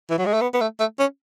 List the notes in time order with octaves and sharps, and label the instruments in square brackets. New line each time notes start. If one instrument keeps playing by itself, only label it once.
[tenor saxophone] E3
F#3
G#3
A3
B3
B3
A3
A3
C#4